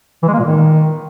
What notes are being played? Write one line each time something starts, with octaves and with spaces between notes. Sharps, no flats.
E3
G#3
A#3
A#2
D#3